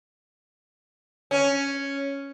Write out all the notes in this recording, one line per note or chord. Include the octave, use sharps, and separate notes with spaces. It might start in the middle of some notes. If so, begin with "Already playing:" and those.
C#4